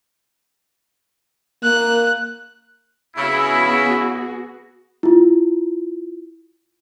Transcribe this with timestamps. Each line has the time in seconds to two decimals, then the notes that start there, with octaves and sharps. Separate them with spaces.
1.63 A#3 F#6
3.17 C#3 B3 E4 F#4 G#4
5.03 E4 F4